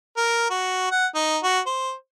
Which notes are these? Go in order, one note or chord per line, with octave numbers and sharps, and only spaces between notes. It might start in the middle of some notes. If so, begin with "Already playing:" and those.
A#4
F#4
F#5
D#4
F#4
C5